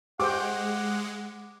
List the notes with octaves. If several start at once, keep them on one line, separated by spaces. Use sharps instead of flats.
G#3 G4 C5 F#5 G5 D6